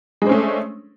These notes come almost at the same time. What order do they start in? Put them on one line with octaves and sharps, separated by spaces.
G#3 D4 C5 C#4 A3